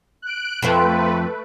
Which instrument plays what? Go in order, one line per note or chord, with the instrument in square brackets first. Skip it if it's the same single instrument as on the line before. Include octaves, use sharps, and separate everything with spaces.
[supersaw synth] F#6 D7
[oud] F2 F3 C5 [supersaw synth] A3 B4